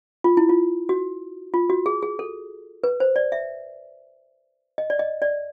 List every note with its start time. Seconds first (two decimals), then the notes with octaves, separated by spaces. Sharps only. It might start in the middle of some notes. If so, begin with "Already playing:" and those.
0.24 F4
0.37 E4
0.49 F4
0.89 F#4
1.54 F4
1.70 F#4
1.86 G#4
2.02 G#4
2.19 A4
2.84 B4
3.00 C5
3.16 D5
3.32 E5
4.78 D#5
4.90 D5
4.99 D#5
5.22 D5